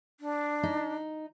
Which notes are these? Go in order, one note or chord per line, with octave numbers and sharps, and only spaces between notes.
D4
D#4